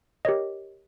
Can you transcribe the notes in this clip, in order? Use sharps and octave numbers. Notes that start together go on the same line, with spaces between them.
G4 A#4 C#5 D#5